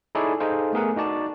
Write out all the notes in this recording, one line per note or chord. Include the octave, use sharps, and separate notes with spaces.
D#4 E4 G#4 A4 C#5 D5
D#4 G#4 A4 C5 F5
A3 B3 G#4 A#4 F#5
D#4 F#4 D5 A5